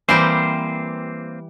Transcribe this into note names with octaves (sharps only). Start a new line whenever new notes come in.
E3 G3 A#3 C4 G4 C5